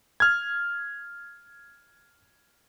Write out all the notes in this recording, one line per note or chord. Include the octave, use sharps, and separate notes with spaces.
F6 G#6